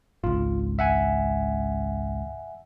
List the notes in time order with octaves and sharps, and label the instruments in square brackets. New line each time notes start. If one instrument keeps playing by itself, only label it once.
[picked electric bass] G#1 C#2 [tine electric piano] F4
[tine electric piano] E5 F#5 G#5